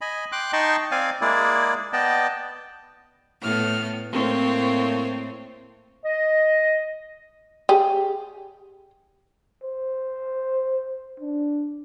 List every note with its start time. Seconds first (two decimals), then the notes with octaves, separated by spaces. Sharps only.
0.01 D#5 G#5 B5
0.32 G5 C6 D6 F#6
0.53 D#4 D#5 G5 A5 C6 C#6
0.91 C4 D5 F5 G#5
1.21 G#3 A#3 E4 G#4 D5
1.93 B3 D5 D#5 G5 A5
3.42 A2 B3 F6
4.13 A2 A#3 C4 C5 C#5
6.04 D#5
7.69 G4 G#4
9.63 C5
11.20 D4